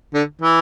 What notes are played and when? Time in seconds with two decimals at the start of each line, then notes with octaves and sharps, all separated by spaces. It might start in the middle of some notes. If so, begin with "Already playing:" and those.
0.14 D3
0.41 E3